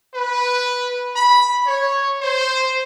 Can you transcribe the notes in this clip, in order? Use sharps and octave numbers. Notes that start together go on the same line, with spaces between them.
B4
B5
C#5
C5